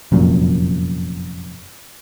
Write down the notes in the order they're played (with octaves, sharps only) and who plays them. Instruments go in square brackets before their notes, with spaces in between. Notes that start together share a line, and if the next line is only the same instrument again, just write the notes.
[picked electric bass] F1 F#2 A#2